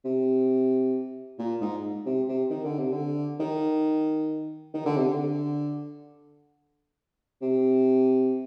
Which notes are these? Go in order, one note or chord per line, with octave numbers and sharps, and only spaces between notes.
C3
A#2
G#2
C3
C3
D#3
D3
C3
D3
D#3
D#3
D3
C3
D3
C3